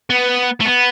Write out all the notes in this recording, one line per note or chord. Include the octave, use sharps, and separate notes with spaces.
B3
A3
B3